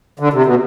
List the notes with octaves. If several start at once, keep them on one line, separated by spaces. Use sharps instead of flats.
D3
C3
B2